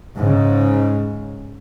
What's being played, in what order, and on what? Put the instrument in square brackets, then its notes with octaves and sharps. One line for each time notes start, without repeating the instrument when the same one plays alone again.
[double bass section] G#2 C#3